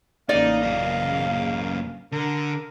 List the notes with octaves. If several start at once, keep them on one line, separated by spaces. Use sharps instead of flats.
A1 C#3 A#3 D#4 D5 F5
F#2 D#5
D3 A#4